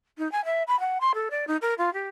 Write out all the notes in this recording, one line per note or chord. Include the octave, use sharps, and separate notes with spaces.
D#4
G#5
E5
B5
F#5
C6
A4
D5
D#4
A#4
F4
G4